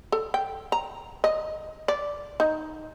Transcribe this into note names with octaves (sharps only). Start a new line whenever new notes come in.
A4
G5
A#5
D#5
D5
D#4